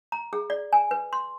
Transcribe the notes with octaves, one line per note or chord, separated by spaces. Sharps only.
A#5
G#4
D5
G#5
B4
C6